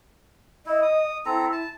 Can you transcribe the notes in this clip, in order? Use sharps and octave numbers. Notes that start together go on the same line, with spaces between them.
E4 D#5
D#6
C4 E4 A4 A#5
A5